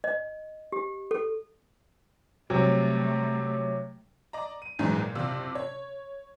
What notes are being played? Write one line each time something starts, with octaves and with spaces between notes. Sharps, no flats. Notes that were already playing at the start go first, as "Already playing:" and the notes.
D#5
G4
A4
C3 F#3 G3 A3
D5 D#5 A#5
D#7
A#1 E2 G#2 E3 F#3 G#3
A#2
F#1 C3 F4 D5 E6
C#5